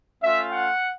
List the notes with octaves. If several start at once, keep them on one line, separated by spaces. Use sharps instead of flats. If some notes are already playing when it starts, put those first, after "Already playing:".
A3 C#4 F4 E5
F#5